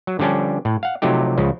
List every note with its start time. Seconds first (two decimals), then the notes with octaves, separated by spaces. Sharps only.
0.07 F#3
0.19 D3 F3 G3 C#4 D4
0.65 A2
0.83 F5 F#5
1.02 C3 F3 F#3 A3 D#4 G4
1.38 C#2 C#3 F3